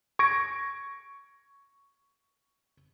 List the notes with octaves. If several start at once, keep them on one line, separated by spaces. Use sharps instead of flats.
C#6 G#6 A#6 D7